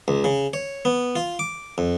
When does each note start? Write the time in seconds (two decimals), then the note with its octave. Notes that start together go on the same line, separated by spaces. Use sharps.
0.08 C#2
0.24 C#3
0.53 C#5
0.85 B3
1.16 F4
1.39 D6
1.78 F2